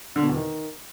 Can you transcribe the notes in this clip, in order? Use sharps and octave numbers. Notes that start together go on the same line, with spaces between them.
D3
B2
E2
D#3